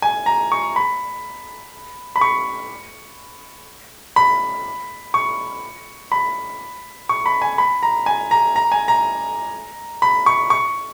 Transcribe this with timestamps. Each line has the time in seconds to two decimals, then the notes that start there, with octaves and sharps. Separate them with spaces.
0.02 G#5
0.26 A#5
0.52 C#6
0.76 B5
2.16 B5
2.21 C#6
4.16 B5
5.14 C#6
6.12 B5
7.09 C#6
7.26 B5
7.42 G#5
7.58 B5
7.83 A#5
8.06 G#5
8.31 A#5
8.56 A#5
8.72 G#5
8.88 A#5
10.02 B5
10.26 C#6
10.50 C#6